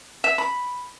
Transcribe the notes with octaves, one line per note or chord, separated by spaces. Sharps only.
E5
B5